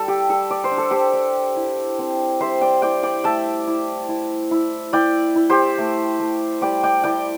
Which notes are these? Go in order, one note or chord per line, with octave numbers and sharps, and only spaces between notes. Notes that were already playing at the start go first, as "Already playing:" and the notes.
Already playing: G3 A4
G4
G3 A4
D5
C5
D4
A4
G4 C5
D4
E4
C4
G3 C5 E5
D5 G5
E4 D5 G5
D5 G5
A3 E5 A5
E4
E4
E4
E4 D5 G5
E4
G4 C5
A3
A3
G3 D5 G5
D5 G5
E4 D5 G5